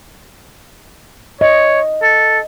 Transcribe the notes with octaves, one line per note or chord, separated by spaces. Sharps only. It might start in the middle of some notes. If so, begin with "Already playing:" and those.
C#5 D#5
A4